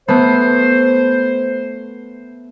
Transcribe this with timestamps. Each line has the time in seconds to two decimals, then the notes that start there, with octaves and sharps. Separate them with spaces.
0.08 A3 B3 C5